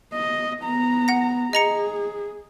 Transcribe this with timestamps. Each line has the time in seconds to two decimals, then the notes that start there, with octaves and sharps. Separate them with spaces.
0.13 D#5
0.63 B3 A#5
1.08 F#5 A#6
1.53 G#4 D#5 A#5 C#7